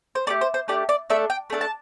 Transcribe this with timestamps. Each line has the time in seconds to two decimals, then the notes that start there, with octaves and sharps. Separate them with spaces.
0.15 C5
0.27 A3 D4 G4 D5
0.41 C5
0.54 C5
0.68 A3 D4 G4 D5
0.89 D5
1.10 A3 D4 A4 E5
1.30 G5
1.50 A3 D4 A4
1.61 A5